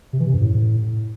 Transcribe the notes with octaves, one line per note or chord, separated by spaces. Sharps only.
C3
E3
C3
F#2
A2